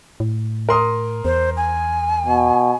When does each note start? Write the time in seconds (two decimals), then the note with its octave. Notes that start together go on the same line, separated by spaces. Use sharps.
0.20 A2
0.69 A#4 C6 D#6
1.25 E2 C5
1.57 G#5
2.26 B2